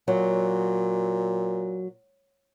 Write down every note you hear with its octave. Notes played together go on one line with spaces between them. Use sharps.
A#2 F#3